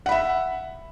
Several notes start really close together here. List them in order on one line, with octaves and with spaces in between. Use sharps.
F#5 B5 E5